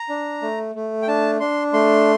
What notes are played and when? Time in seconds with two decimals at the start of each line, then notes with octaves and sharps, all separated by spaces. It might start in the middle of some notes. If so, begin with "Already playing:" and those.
Already playing: A#5
0.09 D4
0.42 A3
0.75 A3
1.02 G5
1.08 D4 A5
1.40 D4 C6
1.73 A3 C6